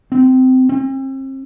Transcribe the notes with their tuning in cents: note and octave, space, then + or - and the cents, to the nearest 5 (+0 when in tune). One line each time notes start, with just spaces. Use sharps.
C4 -20
C4 +40